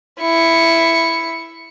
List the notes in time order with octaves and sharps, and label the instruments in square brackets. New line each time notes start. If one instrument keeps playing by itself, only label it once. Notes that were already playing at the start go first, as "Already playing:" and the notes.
[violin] E4 C#7